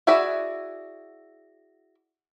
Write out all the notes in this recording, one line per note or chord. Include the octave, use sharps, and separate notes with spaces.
E4 F#4 G#4 D5 E5